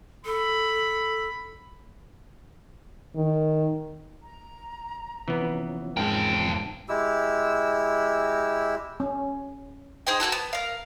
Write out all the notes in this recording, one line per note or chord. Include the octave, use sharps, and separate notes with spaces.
A4 B5
D#3
A#5
C3 E3 F3 B3 C#4
E2 G#2 A#4 G5 A5
G#3 E4 G4 E6
C#4
D#4 G#4 C5 G5
A#3 D#4 F#4 A4
B3
A#4 F5